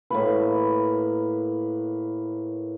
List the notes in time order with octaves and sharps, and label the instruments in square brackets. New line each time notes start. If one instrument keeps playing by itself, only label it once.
[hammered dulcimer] A2 A#3 B4